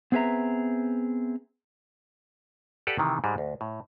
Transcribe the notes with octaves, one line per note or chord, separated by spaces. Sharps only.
B3 C4 G#4 B4 E5 A#5
G4 A4 B4 D5 F5 F#5
C3 D#3 E3
G#2 G3 G#3
D2
A2